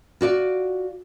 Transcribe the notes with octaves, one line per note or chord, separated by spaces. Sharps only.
F4 F#4 D5